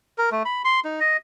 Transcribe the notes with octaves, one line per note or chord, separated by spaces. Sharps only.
A#4
A3
B5
C6
D#4
D#5